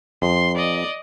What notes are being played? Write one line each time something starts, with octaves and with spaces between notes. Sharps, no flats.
F2 C6
D5 D#5